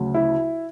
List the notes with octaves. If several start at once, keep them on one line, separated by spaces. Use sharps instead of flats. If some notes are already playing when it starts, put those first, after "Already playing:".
Already playing: D2 C#3 F#3
E4